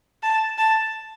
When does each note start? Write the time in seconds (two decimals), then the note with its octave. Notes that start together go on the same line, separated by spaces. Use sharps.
0.23 A5
0.58 A5